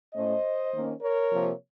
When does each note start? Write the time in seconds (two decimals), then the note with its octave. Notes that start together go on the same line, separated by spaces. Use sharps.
0.14 A2 A3 C#4 C5 D#5
0.73 D#3 A#3 C#4
1.02 A#4 C#5
1.31 C3 F3 A#3